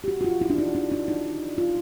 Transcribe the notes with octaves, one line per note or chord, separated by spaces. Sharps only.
G4
F#4
F#4
F4
E4
D4
D#4
D4
D4
D#4
F4